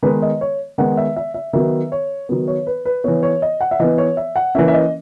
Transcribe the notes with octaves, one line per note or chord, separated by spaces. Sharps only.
D#3 G#3 B3 B4
D#5
C#5
D#3 G#3 B3 F#5
E5
E5
E5
D#3 F#3 B3 E5
C#5
D#3 F#3 B3
C#5
B4
B4
E3 B3 C#5
C#5
D#5
F#5
E5
E3 B3 D#5
C#5
E5
F#5
E3 A#3 C#4 E5
E5
D#5